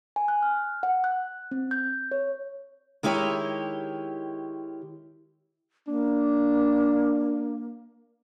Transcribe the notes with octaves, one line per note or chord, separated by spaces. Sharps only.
G#5
F#6
F6
F#5
F#6
C4
G6
C#5
D#3 G#3 E4 G4 C#5
A#3 D4